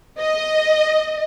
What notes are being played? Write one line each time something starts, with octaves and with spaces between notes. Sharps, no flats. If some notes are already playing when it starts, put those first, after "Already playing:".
D#5